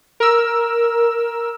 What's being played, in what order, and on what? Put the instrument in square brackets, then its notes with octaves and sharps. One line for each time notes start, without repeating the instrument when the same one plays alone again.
[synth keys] A#4 E6